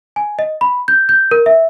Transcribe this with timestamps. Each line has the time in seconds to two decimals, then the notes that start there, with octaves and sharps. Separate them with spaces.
0.16 G#5
0.39 D#5
0.61 B5
0.88 G6
1.09 G6
1.31 A#4
1.46 E5